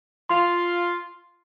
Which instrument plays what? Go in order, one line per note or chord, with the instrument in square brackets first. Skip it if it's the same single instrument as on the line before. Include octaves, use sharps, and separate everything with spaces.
[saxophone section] F4 [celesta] C6